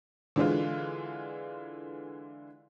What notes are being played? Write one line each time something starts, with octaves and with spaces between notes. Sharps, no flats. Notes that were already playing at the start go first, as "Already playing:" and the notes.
D3 E3 G#3 F4